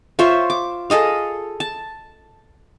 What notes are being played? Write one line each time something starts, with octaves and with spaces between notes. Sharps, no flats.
F4 C5 C#5 E5
D6
G#4 A4 D#5 F5
A5